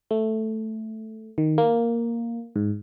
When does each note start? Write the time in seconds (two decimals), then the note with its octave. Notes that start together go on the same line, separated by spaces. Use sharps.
0.11 A3
1.38 D#3
1.58 A#3
2.56 G#2